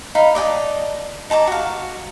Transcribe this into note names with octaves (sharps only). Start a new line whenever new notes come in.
D#4 F5 A#5 B5
D5 D#5 G5 A5
D#4 A5 A#5 D6
F#4 F5